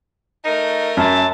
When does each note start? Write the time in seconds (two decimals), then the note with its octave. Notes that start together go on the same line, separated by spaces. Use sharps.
0.44 A3 D#4 A#4
0.97 F#2 E4 A5